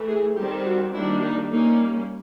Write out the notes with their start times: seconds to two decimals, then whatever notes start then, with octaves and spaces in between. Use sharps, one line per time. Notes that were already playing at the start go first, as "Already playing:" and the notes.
Already playing: E3 A3
0.08 G#4
0.36 D#3 G3 C4 G4
0.65 F#4
0.94 D#3 G3 A#3 D4 E4
1.23 D#4
1.51 G3 A#3 C#4 D#4